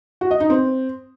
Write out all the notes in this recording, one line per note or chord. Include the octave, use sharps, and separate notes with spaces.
F#4
D#5
D#4
C4